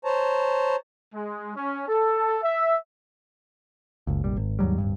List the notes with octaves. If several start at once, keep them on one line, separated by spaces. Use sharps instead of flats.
C5 C#5 A5 A#5
G#3
C#4
A4
E5
F#1 C#2
F1 A#1 G3
G#1
D#2 G#2 F#3 G3
D1 C2 G2